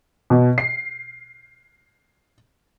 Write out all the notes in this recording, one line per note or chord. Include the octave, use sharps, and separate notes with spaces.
B2
C7